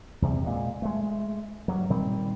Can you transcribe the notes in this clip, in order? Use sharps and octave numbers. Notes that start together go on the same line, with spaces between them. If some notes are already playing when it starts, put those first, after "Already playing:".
E2 C3
A#2 G#3
G#3 A3
G2 F#3
A#2 D#3 G3 C4